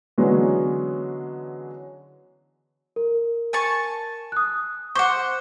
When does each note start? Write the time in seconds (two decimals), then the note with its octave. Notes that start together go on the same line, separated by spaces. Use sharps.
0.18 D3 E3 F#3 G#3 B3 C#4
2.96 A#4
3.53 G#5 A5 C#6
4.32 D#6 F#6
4.95 C5 F#5 C#6 D6